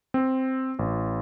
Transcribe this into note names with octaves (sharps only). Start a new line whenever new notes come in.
C4
A1